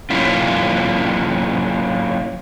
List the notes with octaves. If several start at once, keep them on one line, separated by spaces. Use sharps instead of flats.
F#3 A#3 C#4 E4 F4